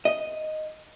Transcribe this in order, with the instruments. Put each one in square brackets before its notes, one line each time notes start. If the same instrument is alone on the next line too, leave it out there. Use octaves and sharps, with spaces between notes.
[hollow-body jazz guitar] D#5